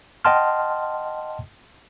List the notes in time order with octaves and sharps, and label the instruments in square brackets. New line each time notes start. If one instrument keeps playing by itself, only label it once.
[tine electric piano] D#5 F#5 G5 A5 C6 F6